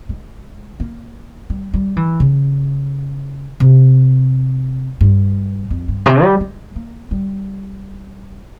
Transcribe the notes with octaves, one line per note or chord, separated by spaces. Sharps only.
G#3
A#3
G3
G3
E3
C#3
C3
G2
F2
G2
C3
G3
G#3
A#3
G3